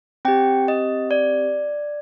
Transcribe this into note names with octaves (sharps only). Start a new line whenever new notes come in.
C4 G4 G5
D#5
D5